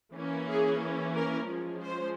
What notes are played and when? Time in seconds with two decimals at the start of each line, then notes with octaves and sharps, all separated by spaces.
0.16 E3 A#3 C#4
0.49 G#4
1.16 A#4
1.49 F3 G#3 C#4
1.83 C5